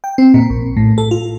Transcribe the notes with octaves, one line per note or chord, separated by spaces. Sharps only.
G5
C4
A#2
A#1
A2
A4
F4